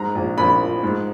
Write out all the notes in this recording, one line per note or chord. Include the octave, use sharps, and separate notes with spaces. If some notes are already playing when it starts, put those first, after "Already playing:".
Already playing: G#2 A#5
A#1
A#1 B5
F3
G#2